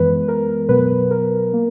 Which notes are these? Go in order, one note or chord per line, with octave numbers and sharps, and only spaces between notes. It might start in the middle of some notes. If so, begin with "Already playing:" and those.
Already playing: F#2 E3 G#3 B3 B4
A#4
B2 F#3 B3 B4
A#4
A#3